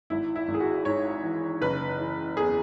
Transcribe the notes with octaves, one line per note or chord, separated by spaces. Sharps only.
G#1 E4
E4
G#1
G#4
F#4
G#2 C#5
E3
F#1 B4
E3
E2 G#4